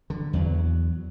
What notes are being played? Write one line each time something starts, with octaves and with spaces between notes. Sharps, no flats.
D3
E2 F#3